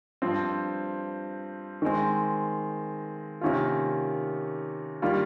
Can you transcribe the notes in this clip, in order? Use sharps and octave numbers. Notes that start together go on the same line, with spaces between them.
G2 F3 C4
D#3 G#3 C4
C3 D#3 A#3 C#4 F4
D#3 G3 A#3 F4